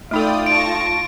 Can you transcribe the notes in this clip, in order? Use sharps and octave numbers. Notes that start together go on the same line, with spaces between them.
A3 D#4 F4 A4 D5 G5 D#6
A5 C#6 A#6 D7